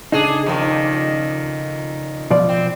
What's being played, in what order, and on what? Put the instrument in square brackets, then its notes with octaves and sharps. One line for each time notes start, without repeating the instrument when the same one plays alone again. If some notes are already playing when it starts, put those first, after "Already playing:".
[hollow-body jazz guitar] C#3 D#4 [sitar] D4 G#4 A4
[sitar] F2 A#2 D#3
[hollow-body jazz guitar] B2 F3 D5
[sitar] C4